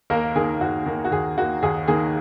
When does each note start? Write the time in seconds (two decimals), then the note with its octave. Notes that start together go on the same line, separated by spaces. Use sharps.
0.10 D#2 A#3 A#4
0.36 D#3 A#3 G#4
0.61 D#2 F#4
0.86 D#3 A#3
1.05 F#4
1.12 D#2 G#4
1.37 D#3 A#3 F#4
1.63 D#2 G#4
1.88 D#3 A#3 G#4